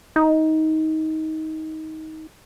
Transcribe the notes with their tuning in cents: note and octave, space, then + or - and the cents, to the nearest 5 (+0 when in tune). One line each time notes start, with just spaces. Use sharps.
D#4 +20